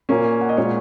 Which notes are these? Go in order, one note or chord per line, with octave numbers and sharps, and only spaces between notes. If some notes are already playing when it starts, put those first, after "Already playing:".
A#2 A#3 C#4
F#5
D#5
A#2 G#3 C#4 C#5